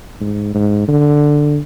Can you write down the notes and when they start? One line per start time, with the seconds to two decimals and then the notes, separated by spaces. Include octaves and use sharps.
0.20 G#2
0.54 G#2
0.88 D3